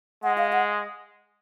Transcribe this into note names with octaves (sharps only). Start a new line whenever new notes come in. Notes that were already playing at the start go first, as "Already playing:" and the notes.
G#3 F#5
F5
F#5